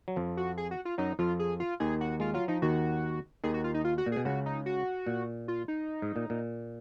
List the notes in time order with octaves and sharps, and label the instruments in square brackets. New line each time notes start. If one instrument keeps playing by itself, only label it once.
[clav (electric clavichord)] F#3
F2 F3
[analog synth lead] F#4
G#4
F#4
F4
[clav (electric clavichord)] F#2 F#3 [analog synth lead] D#4
[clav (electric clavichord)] F2 F3 [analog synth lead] F4
[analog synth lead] G#4
F4
[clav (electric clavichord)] D#2 D#3 [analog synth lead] G#4
[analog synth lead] F#4
[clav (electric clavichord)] G#3 [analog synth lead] F4
[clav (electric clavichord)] F#3 [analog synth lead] F4
[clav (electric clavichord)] F3 [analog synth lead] D#4
[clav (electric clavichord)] D#2 D#3 [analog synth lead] F#4
[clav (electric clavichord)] D#2 D#3 [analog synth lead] G#4
[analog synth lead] F#4
F4
D#4
F4
F#4
[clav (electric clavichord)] A#2
[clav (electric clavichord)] B2 [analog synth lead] G#4
[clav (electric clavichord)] C#2 C#3 [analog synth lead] F#4
[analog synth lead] D#4
F#4
[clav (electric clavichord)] A#2
[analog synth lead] F4
D#4
[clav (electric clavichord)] G#2
A#2
A#2